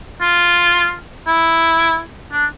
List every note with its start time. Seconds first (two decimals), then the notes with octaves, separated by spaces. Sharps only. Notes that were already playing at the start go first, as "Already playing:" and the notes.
0.21 F4
1.27 E4
2.32 D4